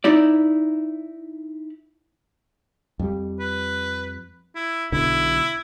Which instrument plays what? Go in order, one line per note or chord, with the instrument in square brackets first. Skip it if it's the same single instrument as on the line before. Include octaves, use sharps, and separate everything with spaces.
[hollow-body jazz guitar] D#4 E4 D5
[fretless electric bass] F2 G3
[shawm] B4
E4
[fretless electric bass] B1 B2 D3 [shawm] E4